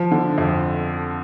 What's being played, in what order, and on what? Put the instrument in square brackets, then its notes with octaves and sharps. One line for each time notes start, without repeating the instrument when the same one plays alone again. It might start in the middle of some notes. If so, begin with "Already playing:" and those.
Already playing: [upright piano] F3
D3
F2